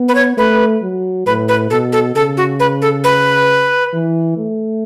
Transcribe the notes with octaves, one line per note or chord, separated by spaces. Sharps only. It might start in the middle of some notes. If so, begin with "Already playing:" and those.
Already playing: B3
B4
C#5
A3 B4
F#3
A2 B4
B4
B2 A4
A4
C#3 A4
F#4
B4
A4
B4
E3
A3